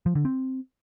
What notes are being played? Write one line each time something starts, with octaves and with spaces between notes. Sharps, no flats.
F3
D3
C4